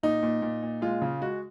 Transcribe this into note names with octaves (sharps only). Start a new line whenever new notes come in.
A#2 D#4
A#2
A#2
A#2
G#3 F4
C#3
G#3 F#4